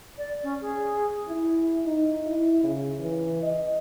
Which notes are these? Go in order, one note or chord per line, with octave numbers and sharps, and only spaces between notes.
D5
C#4
G#4
E4
D#4
E4
C#3
E3
D#5